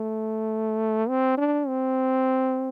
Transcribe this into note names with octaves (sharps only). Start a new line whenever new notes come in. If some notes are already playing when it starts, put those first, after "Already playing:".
Already playing: A3
C4
D4
C4